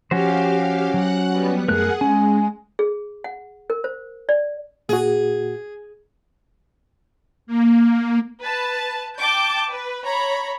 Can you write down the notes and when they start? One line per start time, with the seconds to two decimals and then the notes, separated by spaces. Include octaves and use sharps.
0.11 F3 C#4 F#4 G4 C5 F5
0.94 F#3 F#5 F#6
1.31 G3 B3
1.68 F#2 A3 G#4 A#4 F#5 F#6
2.01 G#3 C#4 G#5
2.79 G#4
3.24 F#5
3.70 A#4
3.84 C5
4.29 D5
4.89 A#2 F#4 G#4
7.47 A#3
8.42 B4 A5
9.19 G5 A5 D6 G6
9.70 B4
10.05 C#5 A#5 B5